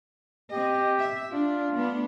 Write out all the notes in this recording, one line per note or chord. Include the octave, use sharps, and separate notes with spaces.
C4 G4 D#5
E5
D4 F4
A3 B3 D4